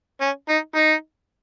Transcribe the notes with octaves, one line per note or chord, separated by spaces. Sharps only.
C#4
D#4
D#4